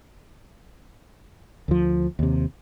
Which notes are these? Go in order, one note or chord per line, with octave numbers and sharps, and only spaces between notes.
D2 F3
D#2 C3